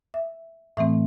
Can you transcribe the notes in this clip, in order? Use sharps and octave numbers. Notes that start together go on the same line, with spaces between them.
E5
A2 E3 A3 C4 E5